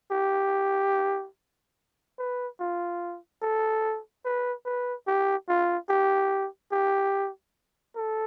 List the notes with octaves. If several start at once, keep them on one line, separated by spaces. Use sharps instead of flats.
G4
B4
F4
A4
B4
B4
G4
F4
G4
G4
A4